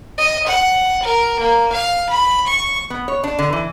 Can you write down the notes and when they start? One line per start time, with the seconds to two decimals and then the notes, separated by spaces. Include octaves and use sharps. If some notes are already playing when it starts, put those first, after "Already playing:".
0.18 D#5
0.47 F#5
1.03 A#4
1.40 A#3
1.72 F5
2.10 B5
2.47 C#6
2.90 B3
3.08 C#5
3.24 D4
3.39 D3
3.53 E3